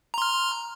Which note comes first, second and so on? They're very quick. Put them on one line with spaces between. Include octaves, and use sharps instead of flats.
A#5 C6 F6